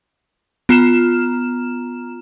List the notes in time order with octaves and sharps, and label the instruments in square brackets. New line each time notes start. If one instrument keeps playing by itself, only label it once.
[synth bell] B3 F4 A#5 F6 E7